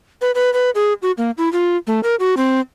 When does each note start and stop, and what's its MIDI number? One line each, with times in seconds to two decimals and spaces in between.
0.21 0.31 71
0.35 0.52 71
0.53 0.70 71
0.75 0.93 68
1.02 1.12 66
1.18 1.31 58
1.38 1.51 64
1.53 1.77 65
1.87 2.00 57
2.03 2.15 70
2.20 2.35 66
2.37 2.60 60